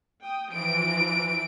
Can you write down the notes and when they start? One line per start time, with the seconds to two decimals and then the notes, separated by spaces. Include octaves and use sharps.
0.22 G5 D#6
0.53 E3 F3 D7